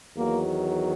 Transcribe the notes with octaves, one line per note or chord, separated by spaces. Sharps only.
E2 D#3 F#3 A#3